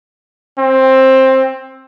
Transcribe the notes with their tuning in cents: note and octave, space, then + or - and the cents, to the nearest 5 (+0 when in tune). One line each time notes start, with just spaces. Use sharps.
C4 +15